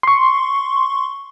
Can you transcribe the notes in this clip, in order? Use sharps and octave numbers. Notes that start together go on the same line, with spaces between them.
C6 C#6